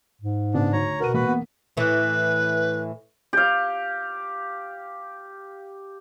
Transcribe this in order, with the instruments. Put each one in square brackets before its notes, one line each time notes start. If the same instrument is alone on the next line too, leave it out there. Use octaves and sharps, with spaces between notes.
[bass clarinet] G#2
[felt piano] C#3 B3 [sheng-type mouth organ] D4
[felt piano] D2 D#4 [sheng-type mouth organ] C#5 A#5
[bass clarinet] B2 [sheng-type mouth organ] F#4 A#4 [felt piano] B4 D#7
[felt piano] E1 A#3 B6 [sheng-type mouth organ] F#4 B4
[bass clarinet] B3
[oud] A2 E3 [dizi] B4
[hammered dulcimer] G4 F5